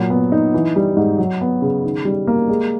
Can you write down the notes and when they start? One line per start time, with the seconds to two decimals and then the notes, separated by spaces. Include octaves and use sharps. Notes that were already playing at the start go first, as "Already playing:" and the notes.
Already playing: A#2 F#3
0.10 B3
0.32 D#4
0.54 E3
0.76 G3
0.97 G#2
1.18 F#3
1.41 B3
1.62 C#3
1.84 D#3
2.05 G3
2.27 A#3
2.49 G#3